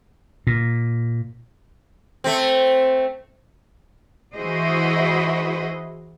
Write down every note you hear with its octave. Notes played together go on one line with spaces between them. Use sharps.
A#2
A3 C4
E3 E4 F#4 G#4 C5 D#5